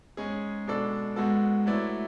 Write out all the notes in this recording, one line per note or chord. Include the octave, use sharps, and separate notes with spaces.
G#2 G#3 C#4 G#4
B2 G#3 D4 A4 D5
G#2 G#3 B3 F#4 A4
F#3 A3 E4 B4 D5